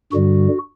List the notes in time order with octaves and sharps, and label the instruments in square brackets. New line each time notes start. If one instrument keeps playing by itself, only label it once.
[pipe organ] G2 D3 G3 F#4